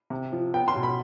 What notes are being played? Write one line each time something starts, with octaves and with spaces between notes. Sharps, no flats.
C3
F3
B3 G5
C6
B2
B5